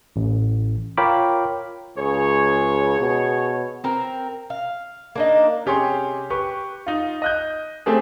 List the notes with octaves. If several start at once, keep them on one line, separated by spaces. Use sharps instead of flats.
A1
F4 A#4 C#5 G5 B5 D6
C#2 G#4 C#5
B2
C4 A#4
F5
A#3 D4 D#4
C3 C#4 G4 G#4 C#5 C6
G4 B4 C#6
D#4 F4
D#5 F#6 G6
A3 C4 G4 G#4